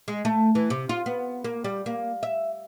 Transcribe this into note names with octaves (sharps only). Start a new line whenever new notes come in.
G#3
A3
E3
C3
F4
B3
A#3
G3
A#3
E5